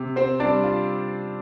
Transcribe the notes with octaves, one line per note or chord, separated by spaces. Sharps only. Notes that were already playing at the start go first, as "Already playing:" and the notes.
Already playing: C3
C4 C5
G3 C4 D4 D5
F4